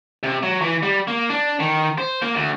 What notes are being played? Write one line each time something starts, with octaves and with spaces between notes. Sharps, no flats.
C3
F#3
E3
G3
A#3
D4
D#3
C5
A#3
D2